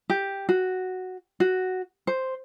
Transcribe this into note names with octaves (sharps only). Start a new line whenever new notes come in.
G4
F#4
F#4
C5